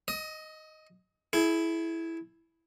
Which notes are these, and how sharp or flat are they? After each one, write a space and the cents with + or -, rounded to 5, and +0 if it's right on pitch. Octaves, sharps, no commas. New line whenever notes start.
D#5 +0 D#6 +40
E4 +0 G#4 +35